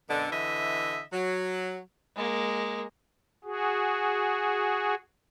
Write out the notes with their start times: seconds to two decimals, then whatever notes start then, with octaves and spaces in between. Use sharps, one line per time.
0.08 F#2 B2 D3
0.30 D3 E3 D#5 E5
1.13 F#3
2.16 G#3 A#3
3.44 F#4 G#4